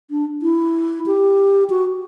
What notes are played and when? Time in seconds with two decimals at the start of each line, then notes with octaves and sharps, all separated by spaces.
0.11 D4
0.42 E4
1.06 G4
1.70 F#4